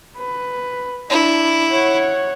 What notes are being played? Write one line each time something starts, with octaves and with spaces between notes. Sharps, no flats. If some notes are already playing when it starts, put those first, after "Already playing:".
B4
D4 E4
C#5 F#5